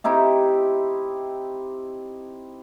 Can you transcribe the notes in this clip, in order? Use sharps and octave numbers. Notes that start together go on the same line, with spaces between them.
C4 D#4 E4 G4